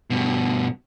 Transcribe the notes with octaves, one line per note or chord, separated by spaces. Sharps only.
G2 B2